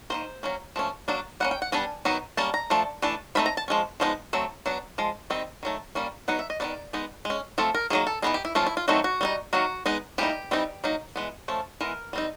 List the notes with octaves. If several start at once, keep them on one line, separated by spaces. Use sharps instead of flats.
D#3 F#3 A#3 C5
F#3 A#3 C#4
F3 A3 C#4
F#3 A#3 D4
G3 A#3 C#4 F#5
G5
F#5
G3 B3 D4 G#5
D#3 F#3 B3 D#4
G3 A#3 C#4 A5
A#5
F3 A3 D4
E3 A3 D4
E3 A3 C4 D#4 B5
A#5
A5
F3 G#3 C#4
F3 G#3 B3 D#4
F#3 A3 C4
F#3 B3 D4
F3 G#3
D#3 G3 C4 D#4
D#3 F#3 A3
G3 A#3 C#4
F#3 B3 D#4 F#5
E5
D#5
D#3 F#3 B3 D5
G#3 B3 D#4
G#3
C#4
F3 A3 C4 A4
A#4
D#3 F#3 A#3 G#4
A4
E3 G3 B3 D#4 G#4
G4
E4
F3 A3 C#4 F4
E4
F4
D#3 F#3 A3 C4 D#4 F#4
F#4
G3 C4 D#4
D#3 F#3 A#3 F#4
G#3 B3 D#4
E3 G3 A#3 D#4 G4
E3 G3 C4 D#4
F#3 A#3 D#4
E3 G#3 B3
F3 A3 C#4
E3 G#3 B3 A#4
G3 C4 D#4